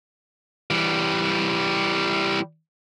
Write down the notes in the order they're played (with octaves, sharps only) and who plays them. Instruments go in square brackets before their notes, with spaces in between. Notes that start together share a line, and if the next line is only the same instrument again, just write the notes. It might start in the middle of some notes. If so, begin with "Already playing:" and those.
[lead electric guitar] E3 G3